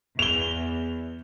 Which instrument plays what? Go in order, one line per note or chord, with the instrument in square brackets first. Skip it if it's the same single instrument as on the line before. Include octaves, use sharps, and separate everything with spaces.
[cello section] E2 [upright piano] F7 G7